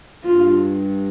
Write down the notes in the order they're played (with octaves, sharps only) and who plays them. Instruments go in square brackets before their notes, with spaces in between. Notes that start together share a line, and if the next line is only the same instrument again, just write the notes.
[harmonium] G2 [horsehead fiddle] F4